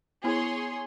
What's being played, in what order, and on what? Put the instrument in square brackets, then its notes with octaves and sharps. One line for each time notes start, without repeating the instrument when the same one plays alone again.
[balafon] B3 E4 [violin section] G#4 C#5 C6